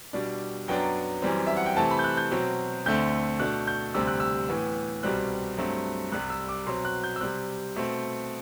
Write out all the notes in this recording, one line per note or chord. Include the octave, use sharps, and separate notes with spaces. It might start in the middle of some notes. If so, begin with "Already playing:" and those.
B2 G3 D4
F#2 F#3 B3 D4 G5
F#2 E3 G3 C4
E5
F#5
G5
C3 E3 A3 C4 A5
B5
G6
F#6
G6
B2 F#3 C4
D2 D3 A3 C4 G6
B2 A3 D4 F#6
G6
D2 C3 G3 C4 E6
F#6
E6
A2 E3 B3
C2 B2 G3 C4 F#6
G2 F#3 A3 C4
C2 C3 G3 F#6
E6
D6
B2 F#3 C4 C6
F#6
G6
E6
C3 G3 C4 F#6
B2 A3 C4